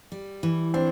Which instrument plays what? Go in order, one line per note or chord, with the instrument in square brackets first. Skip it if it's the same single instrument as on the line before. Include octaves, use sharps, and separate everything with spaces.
[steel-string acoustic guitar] G3
E3
[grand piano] C4 [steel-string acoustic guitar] D4